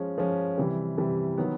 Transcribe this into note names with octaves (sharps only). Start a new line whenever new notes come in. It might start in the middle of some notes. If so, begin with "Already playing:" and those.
Already playing: F3 G#3 C#4
F3 G#3 C#4
C3 E3 G3
C3 E3 G3
D#3 F#3 B3